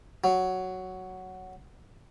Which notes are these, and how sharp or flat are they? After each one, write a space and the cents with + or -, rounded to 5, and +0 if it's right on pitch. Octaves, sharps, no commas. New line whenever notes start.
F#3 +5